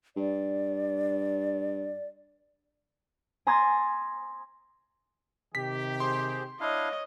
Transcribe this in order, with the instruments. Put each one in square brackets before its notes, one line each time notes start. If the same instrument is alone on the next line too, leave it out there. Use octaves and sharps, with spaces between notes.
[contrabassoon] G2 [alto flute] D5
[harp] G#5 A#5 C6 D#6 G#6 A6
[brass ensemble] C3 D#3 G4 [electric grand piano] B6
[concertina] G#4 C5 [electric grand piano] C6
[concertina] D4 E4 F5 [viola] C#5 D#5